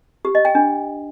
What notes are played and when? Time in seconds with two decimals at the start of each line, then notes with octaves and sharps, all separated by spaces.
0.25 G4
0.35 D#5
0.45 G5
0.55 D4